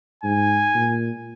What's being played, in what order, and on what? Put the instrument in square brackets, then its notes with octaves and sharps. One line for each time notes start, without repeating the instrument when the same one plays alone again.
[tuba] G#2 [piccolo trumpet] G#5
[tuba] A#2